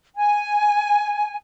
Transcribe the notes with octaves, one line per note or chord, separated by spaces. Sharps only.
G#5